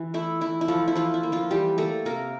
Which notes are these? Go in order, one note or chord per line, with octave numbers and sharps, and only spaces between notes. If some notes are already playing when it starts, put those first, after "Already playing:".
Already playing: E3
A3 E4
E3 E4
E4
F3 A3 F4
E4
E3 F3 F4
E4
A#3
F3 F4
E3 G3 G4
A3 A#3 A4
C3 A#3 A#4